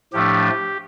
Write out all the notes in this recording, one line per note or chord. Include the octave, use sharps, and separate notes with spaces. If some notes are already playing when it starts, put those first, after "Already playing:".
A2 F3 A3 D4 G4